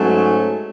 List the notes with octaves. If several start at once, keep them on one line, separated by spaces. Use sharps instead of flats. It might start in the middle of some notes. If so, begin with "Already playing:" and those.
Already playing: G#2 F#3 A3 C#4